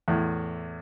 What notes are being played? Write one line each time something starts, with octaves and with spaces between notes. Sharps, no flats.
E2 A2